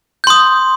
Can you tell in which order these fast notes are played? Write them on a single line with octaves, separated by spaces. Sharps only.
G6 C6 D#6